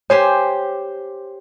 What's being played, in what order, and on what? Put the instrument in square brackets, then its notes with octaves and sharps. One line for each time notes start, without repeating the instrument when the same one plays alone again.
[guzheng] G4 C5 G#5 [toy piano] C#5